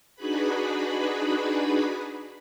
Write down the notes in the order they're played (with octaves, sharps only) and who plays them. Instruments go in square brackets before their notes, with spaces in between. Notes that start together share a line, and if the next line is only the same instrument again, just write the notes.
[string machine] D4 D#4 F#4 G#4 B4 B5